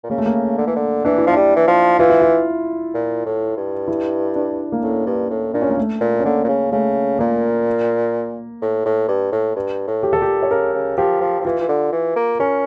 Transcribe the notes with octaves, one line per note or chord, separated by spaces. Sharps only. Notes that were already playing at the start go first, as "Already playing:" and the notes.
A#2
C#3 A#3
A3
A#3
D3
E3
D3
E3 D4
E4
F3
G3 D4
E3
F3
E3 F4
E4
F4
A#2
A2
G2
E4
D4
A#3
A2 C#4
G2
A2
A#2 D4
C#4
A#3
A3
A#2
C#4
D3 A#3
A#2
C#3
C#3 A3
A#2 A#3
A2
A2
G2
A2
G2
A2
G4
A4
A#2 G4
C#5
C#3 A#4
C#3
F3 G4
F3
F3
E3 F4
E3
D3
E3
A#3
C#4 A#4